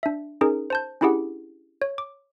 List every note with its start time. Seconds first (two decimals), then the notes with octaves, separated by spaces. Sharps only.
0.03 D4 E5
0.41 C#4 D#4 G#4 A#4
0.70 C5 A5 G6
1.01 C#4 D4 E4 G4 G#4 F#5
1.82 C#5
1.98 D6